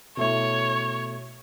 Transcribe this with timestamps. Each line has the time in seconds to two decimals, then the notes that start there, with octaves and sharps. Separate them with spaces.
0.17 B2 A3 E4 C#5